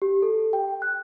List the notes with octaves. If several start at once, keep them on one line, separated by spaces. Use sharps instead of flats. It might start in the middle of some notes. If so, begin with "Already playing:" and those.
G4
A4
G5
F#6